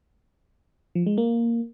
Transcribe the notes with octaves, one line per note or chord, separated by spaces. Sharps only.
F3
G#3
A#3